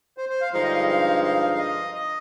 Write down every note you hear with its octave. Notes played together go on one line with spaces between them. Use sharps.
C5
C5
F5
G2 D3 F3 G#3 D#4 F5
D#5
F5
F5
F5
F5
D#5
D#5